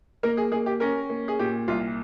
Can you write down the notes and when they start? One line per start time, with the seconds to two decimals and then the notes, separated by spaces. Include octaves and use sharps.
0.23 A#3 A#4
0.37 G#4
0.52 A#3 G#4
0.66 G4
0.80 C#4 A#4
1.10 A#3
1.28 G#4
1.39 A#2 G4
1.68 C2 F4